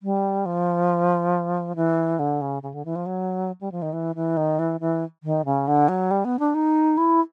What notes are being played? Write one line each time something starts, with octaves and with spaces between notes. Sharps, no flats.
G3
F3
E3
D3
C#3
C#3
D3
E3
F3
F#3
G3
F3
D#3
E3
E3
D#3
E3
E3
D#3
C#3
D3
F#3
G3
B3
D4
D#4
E4